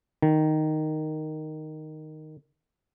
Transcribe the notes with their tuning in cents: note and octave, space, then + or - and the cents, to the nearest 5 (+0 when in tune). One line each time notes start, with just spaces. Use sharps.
D#3 -5